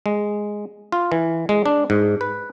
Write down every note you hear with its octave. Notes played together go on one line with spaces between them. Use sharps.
G#3
F4
E3
G#3
D4
G#2
B4